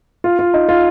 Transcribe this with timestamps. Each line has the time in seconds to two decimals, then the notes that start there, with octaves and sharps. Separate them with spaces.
0.24 F4
0.39 F4
0.54 D#4
0.69 F4